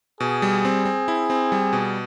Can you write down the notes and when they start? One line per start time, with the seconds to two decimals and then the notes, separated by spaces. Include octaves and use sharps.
0.20 B2 G#4
0.42 G3
0.65 C4
0.85 C4
1.08 E4
1.30 C4
1.52 G3
1.73 B2